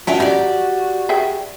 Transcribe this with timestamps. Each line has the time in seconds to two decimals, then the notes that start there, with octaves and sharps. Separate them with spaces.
0.07 D#3 C#4 D4 F4 F#4 E5 G5
0.20 F#3 G4 D5
1.09 G#4 E5 G5